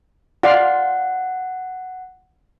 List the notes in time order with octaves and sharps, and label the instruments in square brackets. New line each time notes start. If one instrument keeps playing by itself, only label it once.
[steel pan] F4 D5 F5 [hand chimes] F#5